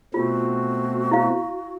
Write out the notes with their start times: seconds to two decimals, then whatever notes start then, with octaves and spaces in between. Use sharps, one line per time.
0.14 B2 A3 C4 F4 F#4
1.11 E4 F5